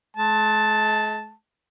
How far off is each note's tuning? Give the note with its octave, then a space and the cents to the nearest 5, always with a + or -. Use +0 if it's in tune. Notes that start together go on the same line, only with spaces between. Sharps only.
G#3 +45 A5 +0